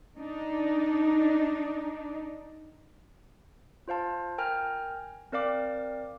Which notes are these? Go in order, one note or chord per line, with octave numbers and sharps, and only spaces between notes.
D4 D#4
F4 C5 F5 A5
A#4 G5 G#5 A#5 F6
C4 A#4 D5 F5 D6